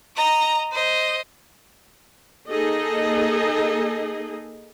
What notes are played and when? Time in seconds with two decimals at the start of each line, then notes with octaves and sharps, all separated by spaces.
0.16 D#5 A#5
0.71 C5 D#5
2.49 A#3 D#4 G#4 A4 D#5